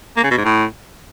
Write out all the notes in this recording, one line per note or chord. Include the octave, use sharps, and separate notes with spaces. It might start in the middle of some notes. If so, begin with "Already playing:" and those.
A#3
C#3
B2
G#2
A2